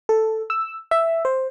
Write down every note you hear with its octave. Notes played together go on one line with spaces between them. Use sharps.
A4
E6
E5
C5